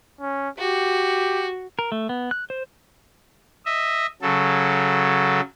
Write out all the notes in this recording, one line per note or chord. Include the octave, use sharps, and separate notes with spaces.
C#4
F#4 G4
A#4
A3
B3
F#6
C5
D#5 E5
C#3 F#3 A4